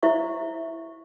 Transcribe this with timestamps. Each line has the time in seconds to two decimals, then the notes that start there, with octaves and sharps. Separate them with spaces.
0.03 E4 C5 E5 F5 C#6